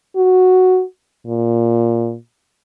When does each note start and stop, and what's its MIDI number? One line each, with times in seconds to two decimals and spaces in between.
0.16 0.83 66
1.27 2.16 46